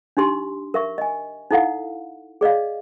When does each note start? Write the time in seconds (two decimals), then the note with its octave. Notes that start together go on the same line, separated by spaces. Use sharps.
0.17 D4 D#4 G4 C6
0.74 A#4 E5 C#6
0.98 D#5 G#5
1.51 D#4 E4 A4 F5 F#5
2.41 G#4 D5 D#5 F5